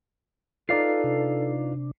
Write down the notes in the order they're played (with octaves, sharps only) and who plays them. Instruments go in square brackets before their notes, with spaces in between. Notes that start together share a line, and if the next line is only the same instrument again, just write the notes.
[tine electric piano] D#4 D5 C7 [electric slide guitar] F4 B4 F5 [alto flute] A4
[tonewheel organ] C3 D4